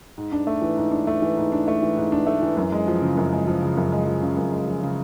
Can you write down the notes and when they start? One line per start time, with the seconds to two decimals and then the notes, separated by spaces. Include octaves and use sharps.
0.18 G#2
0.32 D4
0.47 A3
0.62 E3
0.77 G#2
0.92 D4
1.07 A3
1.22 E3
1.37 G#2
1.52 D4
1.68 A3
1.82 E3
1.97 G#2
2.12 D4
2.27 A3
2.42 E3
2.57 F#2
2.72 G#3
2.88 F3
3.02 C#3
3.17 F#2
3.32 G#3
3.47 F3
3.62 C#3
3.77 F#2
3.92 G#3
4.07 F3
4.23 C#3
4.37 F#2
4.52 G#3
4.67 F3
4.83 C#3